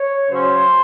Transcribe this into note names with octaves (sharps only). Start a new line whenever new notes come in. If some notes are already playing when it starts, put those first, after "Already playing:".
Already playing: C#5
C#3 F#3 C#4 C5